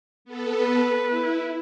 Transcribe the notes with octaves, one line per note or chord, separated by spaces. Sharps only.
B3 A4
B4
E4